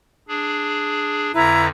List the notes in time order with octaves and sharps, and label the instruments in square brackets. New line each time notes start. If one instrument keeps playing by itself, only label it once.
[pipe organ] D4 G#4
[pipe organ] F2 D3 B4 [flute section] E4 A#5